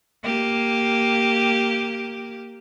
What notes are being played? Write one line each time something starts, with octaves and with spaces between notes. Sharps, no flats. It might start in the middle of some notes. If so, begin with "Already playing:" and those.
A#3 G4